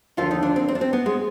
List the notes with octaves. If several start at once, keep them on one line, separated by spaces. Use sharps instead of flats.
D#2 D3 F3 F4
D#4
D4
C4
C4
D4
C4
B3
G#3